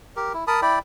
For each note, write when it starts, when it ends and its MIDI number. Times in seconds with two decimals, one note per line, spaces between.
0.16 0.33 67
0.16 0.33 70
0.34 0.44 64
0.47 0.60 70
0.47 0.60 81
0.47 0.60 83
0.47 0.60 87
0.62 0.79 64
0.62 0.79 74
0.62 0.79 79
0.62 0.79 83